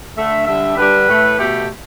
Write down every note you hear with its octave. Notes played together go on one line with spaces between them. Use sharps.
D3 A3 E5
D3 G3 E5
D3 G3 B4
A2 A3
B2 A3 G4